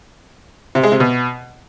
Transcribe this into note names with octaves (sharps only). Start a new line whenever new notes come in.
C3
G#3
C3
B2